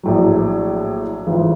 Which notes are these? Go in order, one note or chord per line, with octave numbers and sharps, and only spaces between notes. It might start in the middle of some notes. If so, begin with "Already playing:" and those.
A#1 A2 F#3
A1 G#2 F3